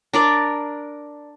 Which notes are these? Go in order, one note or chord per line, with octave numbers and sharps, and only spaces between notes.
D4 A#4 D5